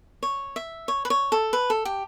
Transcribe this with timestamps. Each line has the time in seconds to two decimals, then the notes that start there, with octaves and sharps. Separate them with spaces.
0.23 C#5
0.56 E5
0.88 C#5
1.05 B4
1.10 C#5
1.32 A4
1.53 B4
1.70 A4
1.85 G4